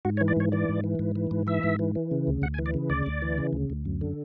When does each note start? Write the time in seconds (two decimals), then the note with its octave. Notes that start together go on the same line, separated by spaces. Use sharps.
0.05 G#2 F#4
0.17 C#5
0.21 E3
0.28 D5
0.37 G#2 C#5
0.52 E3 D5
0.69 G#2
0.84 E3
0.99 G#2
1.16 E3
1.31 G#2
1.47 E3 E5
1.63 G#2
1.79 E3
1.95 E3
2.11 C#3
2.27 D2
2.42 D2 F#5
2.54 G#5
2.59 E3
2.66 D5
2.74 C#3
2.90 D2 D5
3.06 D2
3.22 E3
3.38 C#3
3.53 D2
3.70 D2
3.85 F#2
4.01 D3